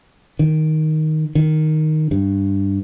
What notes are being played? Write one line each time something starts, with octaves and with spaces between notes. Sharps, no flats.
D#3
D#3
G2